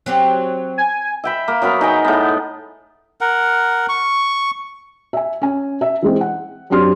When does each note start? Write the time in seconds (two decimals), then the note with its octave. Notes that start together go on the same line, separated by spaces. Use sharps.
0.06 F#3 C4 G4
0.78 G#5
1.24 E5 G5 B5
1.48 A#3
1.62 F#3 B3 A#4 B5
1.81 D#4 G#4 G5
2.04 A2 B3
3.21 A#4 F#5
3.89 C#6
5.13 E5 G#5
5.42 C#4 G#5
5.81 E5
6.02 E3 G#3 C4
6.21 F#5
6.70 F#2 C4 D4 G4 C6 F6